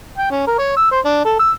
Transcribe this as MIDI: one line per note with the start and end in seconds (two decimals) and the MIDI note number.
0.18 0.30 79
0.30 0.46 61
0.47 0.57 70
0.59 0.75 73
0.77 0.87 88
0.91 1.00 72
1.05 1.22 62
1.25 1.35 69
1.39 1.51 88